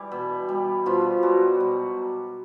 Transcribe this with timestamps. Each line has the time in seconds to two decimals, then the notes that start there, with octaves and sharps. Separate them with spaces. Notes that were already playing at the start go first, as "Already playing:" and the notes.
Already playing: E3 G3 E4
0.12 B2
0.49 G3
0.86 B2 F3 F4
1.23 F#3 G3 F#4
1.60 B2